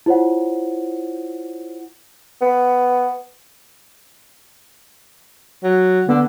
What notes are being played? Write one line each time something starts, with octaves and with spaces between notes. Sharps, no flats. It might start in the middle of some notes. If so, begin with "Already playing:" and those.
E4 F4 C5 C#5 F#5
B3
F#3
D3 B3